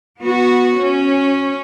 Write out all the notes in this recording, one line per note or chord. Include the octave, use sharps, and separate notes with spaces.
B3 F#4
C#4